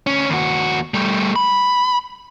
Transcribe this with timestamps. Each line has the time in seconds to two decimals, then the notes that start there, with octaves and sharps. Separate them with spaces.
0.07 D2 C#4
0.30 D#2 F#4
0.94 G3 A3
1.36 B5